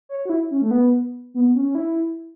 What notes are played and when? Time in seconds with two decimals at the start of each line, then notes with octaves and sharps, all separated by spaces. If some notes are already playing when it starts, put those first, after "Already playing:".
0.09 C#5
0.25 F#4
0.30 E4
0.51 C#4
0.62 A3
0.71 B3
1.34 B3
1.55 C#4
1.66 C#4
1.75 E4